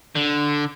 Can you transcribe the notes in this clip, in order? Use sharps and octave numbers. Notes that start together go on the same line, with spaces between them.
D3